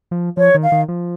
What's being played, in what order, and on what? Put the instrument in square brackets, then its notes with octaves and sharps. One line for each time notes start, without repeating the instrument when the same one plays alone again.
[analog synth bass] F3
[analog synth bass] F3 [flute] C#5
[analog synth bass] D#3
[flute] F5
[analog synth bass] D#3
F3